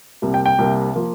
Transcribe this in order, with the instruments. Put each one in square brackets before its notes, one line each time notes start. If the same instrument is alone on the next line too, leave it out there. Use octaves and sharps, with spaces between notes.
[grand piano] C2 C3 A#3
G5
G5
C2 C3 A#3
F3 A#3